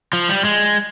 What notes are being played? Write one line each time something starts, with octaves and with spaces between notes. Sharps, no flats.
F3
G3
G#3